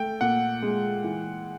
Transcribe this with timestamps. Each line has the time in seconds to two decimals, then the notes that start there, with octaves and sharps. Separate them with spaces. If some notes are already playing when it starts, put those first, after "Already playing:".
Already playing: A3 G5
0.21 A#2 F#5
0.62 G#3
1.04 E3